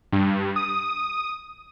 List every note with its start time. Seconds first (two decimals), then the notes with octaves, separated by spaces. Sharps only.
0.12 G2
0.56 D#6